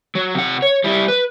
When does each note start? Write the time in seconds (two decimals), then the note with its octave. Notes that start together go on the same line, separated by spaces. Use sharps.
0.15 F#3
0.35 C3 F#5
0.62 C#5
0.84 G3 E4
1.08 B4